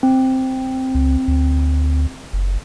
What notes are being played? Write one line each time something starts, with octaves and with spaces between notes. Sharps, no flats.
C4
C#2
D2
F#1